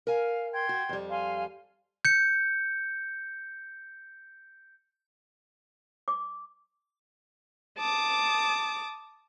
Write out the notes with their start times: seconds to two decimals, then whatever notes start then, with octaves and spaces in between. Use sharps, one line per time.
0.07 A#4 F5 G#5
0.54 G5 C6 G#6
0.69 F#4
0.89 F2 G3
1.10 F5 G#5 C6
2.05 G6 C#7
6.08 D6
7.77 A5 D6 D#6